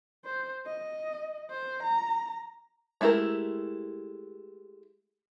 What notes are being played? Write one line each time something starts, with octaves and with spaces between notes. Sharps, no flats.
C5
D#5
C5
A#5
G#3 A3 E4 G4 A#4